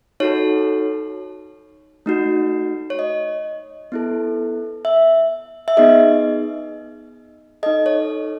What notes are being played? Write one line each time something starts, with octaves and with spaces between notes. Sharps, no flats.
D#4 F#4 A4 C#5
A3 D#4 F#4
C#5
D#5
B3 E4 A4
E5
E5
B3 D#4 G#4 D#5
D#4 A4 D#5
C#5